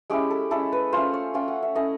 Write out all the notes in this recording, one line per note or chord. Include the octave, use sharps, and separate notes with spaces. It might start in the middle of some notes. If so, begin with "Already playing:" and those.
G#3 C#4 E4 G4
A4
G#3 C#4 E4 A4
B4
A3 C#4 F4 C5
C#5
A3 C#4 F4 G5
F#5
E5
A3 C#4 E4 D#5